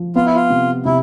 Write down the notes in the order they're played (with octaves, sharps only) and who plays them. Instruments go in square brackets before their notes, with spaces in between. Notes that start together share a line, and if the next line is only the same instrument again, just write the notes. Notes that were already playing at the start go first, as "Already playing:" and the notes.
Already playing: [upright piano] F3
[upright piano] B3 [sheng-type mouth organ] F4
[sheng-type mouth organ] E4
F4
[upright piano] C3
[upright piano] C3 [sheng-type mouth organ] E4